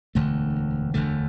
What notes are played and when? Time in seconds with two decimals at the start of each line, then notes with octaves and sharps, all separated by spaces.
0.15 E1 D2 D3 A3
0.94 E1 D2 D3 A3